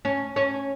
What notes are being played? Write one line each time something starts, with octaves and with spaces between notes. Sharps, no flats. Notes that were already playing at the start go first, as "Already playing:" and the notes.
C#4
C#4